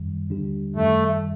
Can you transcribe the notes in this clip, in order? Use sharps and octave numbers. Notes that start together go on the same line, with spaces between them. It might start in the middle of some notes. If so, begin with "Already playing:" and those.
Already playing: F#2 D#3 G3
D#2 D3 G3 D4 G4
F#2 D#3 G3 A3